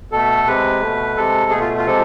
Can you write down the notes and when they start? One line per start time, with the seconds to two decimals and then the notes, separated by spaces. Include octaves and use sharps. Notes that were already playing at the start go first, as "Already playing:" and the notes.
0.12 B2 A3 A4
0.47 C3 G#3 B4
0.81 B2 A3
1.17 C3 G#3 A4
1.51 B2 A3 G#4
1.60 F4
1.78 F4
1.86 C3 F3 G#3 A4